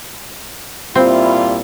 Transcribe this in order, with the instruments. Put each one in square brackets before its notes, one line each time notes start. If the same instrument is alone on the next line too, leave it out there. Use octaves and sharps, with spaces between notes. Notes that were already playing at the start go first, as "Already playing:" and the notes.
[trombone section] A#2 G3 E4 [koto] C4 [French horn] F4